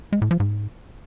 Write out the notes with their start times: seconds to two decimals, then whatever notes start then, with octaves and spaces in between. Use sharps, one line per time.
0.13 G#3
0.22 A2
0.31 F3
0.40 G#2